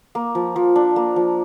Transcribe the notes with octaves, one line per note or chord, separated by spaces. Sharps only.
A#3
F3
F3
D4
A#3
F3